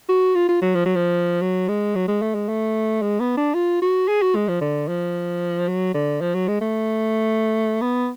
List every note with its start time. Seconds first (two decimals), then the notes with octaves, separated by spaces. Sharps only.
0.09 F#4
0.35 F4
0.49 F4
0.62 F#3
0.75 F3
0.86 F#3
0.96 F3
1.42 F#3
1.68 G#3
1.95 F#3
2.08 G#3
2.22 A3
2.35 G#3
2.49 A3
3.02 G#3
3.20 B3
3.37 D4
3.54 F4
3.82 F#4
4.08 G#4
4.22 F#4
4.35 G#3
4.48 F3
4.61 D3
4.88 F3
5.68 F#3
5.94 D3
6.21 F3
6.34 F#3
6.48 G#3
6.61 A3
7.82 B3